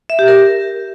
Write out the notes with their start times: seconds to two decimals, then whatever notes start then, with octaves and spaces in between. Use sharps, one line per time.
0.10 E5
0.19 G4
0.28 A#4